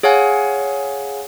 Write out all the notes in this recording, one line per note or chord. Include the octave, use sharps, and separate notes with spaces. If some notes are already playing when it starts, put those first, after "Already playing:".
G#4 C#5 F5 F#5 G#5